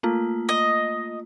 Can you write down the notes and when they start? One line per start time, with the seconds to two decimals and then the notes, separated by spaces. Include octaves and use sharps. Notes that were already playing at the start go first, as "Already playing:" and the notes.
0.03 A3 A#3 F4
0.49 D#5